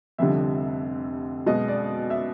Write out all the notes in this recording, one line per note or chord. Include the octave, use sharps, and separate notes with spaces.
F1 F2 D3 G3 E5
B1 B2 G#3 D#5
D5
E5